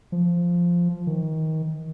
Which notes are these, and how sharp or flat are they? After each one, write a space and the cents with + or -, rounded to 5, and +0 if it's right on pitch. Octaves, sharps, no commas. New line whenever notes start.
F3 -5
D#3 +25